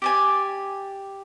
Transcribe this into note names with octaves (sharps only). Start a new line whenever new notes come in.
G4 D5 G#5